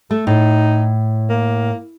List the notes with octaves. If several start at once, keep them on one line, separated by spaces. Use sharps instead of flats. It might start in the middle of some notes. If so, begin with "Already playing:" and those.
A3 A4
A2 D#4
A#3